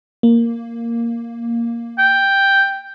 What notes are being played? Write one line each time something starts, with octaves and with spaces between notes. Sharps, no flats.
A#3
G5